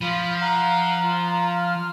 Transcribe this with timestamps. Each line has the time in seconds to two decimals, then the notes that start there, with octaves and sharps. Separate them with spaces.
0.01 F3 F4 B5
0.41 F5 F#5 A#5
1.03 F4
1.61 F6